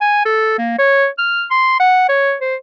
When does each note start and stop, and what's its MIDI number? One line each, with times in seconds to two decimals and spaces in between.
0.01 0.20 80
0.25 0.56 69
0.58 0.76 58
0.79 1.07 73
1.18 1.44 89
1.51 1.78 84
1.80 2.04 78
2.09 2.35 73
2.41 2.55 72